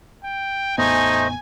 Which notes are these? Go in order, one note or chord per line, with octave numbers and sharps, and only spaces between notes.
G5
A1 E2 A3 B3 D#4 C5 D#5 G#5